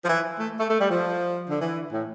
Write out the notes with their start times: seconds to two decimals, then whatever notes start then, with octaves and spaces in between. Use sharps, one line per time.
0.05 F3
0.09 E3
0.40 A3
0.59 A3
0.70 A3
0.81 G3
0.90 F3
1.50 D3
1.61 E3
1.93 A2